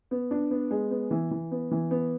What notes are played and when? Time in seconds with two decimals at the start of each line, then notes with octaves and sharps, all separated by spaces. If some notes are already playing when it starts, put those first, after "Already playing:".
0.11 B3
0.31 D4
0.51 B3
0.71 G#3
0.91 B3
1.11 E3
1.31 E3
1.51 B3
1.71 E3
1.91 B3